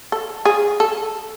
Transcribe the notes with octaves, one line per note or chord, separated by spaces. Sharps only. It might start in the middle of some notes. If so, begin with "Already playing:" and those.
A4
G#4
A4